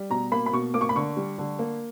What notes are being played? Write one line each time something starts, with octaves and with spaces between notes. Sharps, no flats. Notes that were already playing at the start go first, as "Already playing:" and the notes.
Already playing: G3
B2 A#5
A#3 B5
B5
B2 C#6
A#3 D6
C#6
B5
D3 C#6
G3
D3
A#3